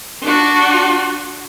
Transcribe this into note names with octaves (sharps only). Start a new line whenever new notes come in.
D4 F#4